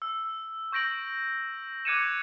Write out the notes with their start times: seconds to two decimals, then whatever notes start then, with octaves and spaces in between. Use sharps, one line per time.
0.02 E6
0.72 C#6 G6 A#6 D7 F#7
1.85 D6 F#6 G#6 C#7 D#7 E7